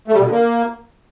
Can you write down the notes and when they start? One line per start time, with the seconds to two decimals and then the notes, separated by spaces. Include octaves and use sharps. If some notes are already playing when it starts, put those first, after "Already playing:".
0.08 A3
0.14 G3
0.19 B2
0.25 D3
0.31 A#3